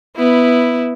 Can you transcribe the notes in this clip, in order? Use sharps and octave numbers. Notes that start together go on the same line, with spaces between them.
B3 E4